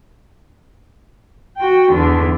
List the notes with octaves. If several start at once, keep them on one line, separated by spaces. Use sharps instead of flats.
F#4 G5
E2 D3